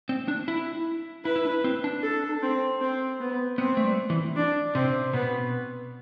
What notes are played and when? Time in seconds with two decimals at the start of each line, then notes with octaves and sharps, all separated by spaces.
0.09 C4
0.28 D4
0.48 E4
1.25 E4 B4
1.36 E4
1.45 D4
1.64 C4
1.84 D4
2.03 A4
2.42 C4
2.81 C4
3.20 B3
3.58 B3 C4
3.77 A3
3.84 G3
4.10 E3
4.36 D4
4.75 C3 C4
5.13 B2 B3